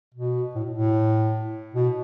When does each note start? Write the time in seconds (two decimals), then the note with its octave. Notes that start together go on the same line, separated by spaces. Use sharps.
0.14 B2
0.55 A2
0.70 A2
1.74 B2